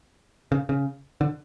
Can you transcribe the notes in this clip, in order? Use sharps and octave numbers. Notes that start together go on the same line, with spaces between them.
C#3
C#3
D3